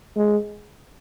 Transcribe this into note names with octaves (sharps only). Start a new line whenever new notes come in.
G#3